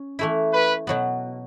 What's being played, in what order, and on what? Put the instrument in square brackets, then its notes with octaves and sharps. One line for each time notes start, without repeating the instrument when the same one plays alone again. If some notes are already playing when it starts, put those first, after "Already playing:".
Already playing: [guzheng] C#4
E3 A3 E4
[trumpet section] B4
[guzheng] B2 F#3 B3